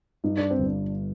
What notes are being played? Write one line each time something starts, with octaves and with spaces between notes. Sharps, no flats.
G2 D#4
D4
C4
G1
D4